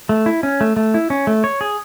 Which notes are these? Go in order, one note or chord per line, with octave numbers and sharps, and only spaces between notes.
A3
E4
C#4
A3
A3
E4
C#4
A3
C#5
G#4